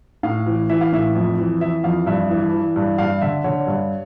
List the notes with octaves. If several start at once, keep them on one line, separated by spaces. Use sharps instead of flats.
A2 F5
E3
E3 E5
F5
A2 E5
F2
E3
E3 E5
F2 F5
G2 E5
E3
E3
G2
G2 F5
D3 E5
D3 C#5
G2